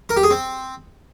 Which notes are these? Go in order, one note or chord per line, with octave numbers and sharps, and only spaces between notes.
A#4
G4
G#4
C4